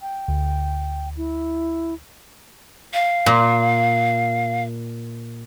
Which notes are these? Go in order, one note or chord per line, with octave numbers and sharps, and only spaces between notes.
G5
D2
E4
F5
A#2